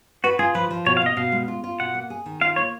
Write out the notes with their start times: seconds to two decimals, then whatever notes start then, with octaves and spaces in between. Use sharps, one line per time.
0.24 F#4 B4
0.39 F4 G#4
0.55 F3 B4
0.71 F3
0.86 B2 C#5
0.97 F5
1.02 B2 D#5
1.17 B2 F5
1.32 G#3
1.48 F4
1.64 F4
1.80 B2 F#5
1.95 A#3
2.10 G#4
2.26 D#3
2.41 F4 F5
2.56 A#3 C#5